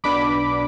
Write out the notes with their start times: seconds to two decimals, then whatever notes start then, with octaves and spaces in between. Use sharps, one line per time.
0.04 B1 B2 B3 D4 B5 D6